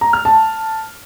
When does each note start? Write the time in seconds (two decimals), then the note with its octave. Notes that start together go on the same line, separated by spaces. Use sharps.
0.01 A#5
0.13 F6
0.25 A5